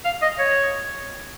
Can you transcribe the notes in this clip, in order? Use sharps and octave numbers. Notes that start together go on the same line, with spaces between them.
F5
D#5
C#5